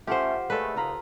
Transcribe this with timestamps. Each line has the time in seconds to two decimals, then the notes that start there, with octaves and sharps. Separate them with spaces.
0.07 A3 C#4 F4 G4 C5 F#5
0.50 A#2 G#3 A3 A4 B4
0.76 D#2 C#3 F4 A#5 B5